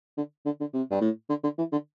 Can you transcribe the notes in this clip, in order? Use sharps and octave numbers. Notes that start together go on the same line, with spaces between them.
D3
D3
D3
C3
G2
A2
D3
D3
E3
D3